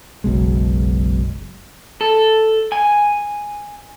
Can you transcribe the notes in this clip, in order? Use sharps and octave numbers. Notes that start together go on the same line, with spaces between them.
F#1 B1 B2 G#3
A4
G#5